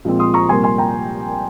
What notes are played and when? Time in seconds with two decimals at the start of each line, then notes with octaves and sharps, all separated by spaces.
0.05 A#2 F3 G#3 C4
0.19 C6 D#6
0.34 A#5 C#6
0.49 C2 A#2 G3 A#3 G#5 C6
0.63 G#5 C6
0.78 G5 A#5